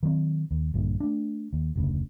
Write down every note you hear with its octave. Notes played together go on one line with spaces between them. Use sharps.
D#3 F#3 A3 C4
D#2
A#1 G2 A#2 D3
A3 D4
D#2
F1 D2 C#3